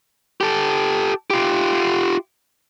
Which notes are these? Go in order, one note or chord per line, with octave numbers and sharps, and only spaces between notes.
G4 A4
F4 G4